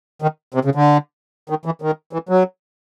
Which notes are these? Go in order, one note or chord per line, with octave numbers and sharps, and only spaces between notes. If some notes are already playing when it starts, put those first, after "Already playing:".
D#3
C3
C#3
D3
D#3
E3
D#3
E3
F#3